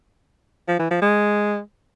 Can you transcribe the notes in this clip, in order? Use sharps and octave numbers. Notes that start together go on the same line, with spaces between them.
F3
E3
F3
G#3